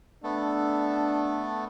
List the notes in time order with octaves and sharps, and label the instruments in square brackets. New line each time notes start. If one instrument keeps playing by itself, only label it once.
[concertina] A3 B3 A4 [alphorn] D4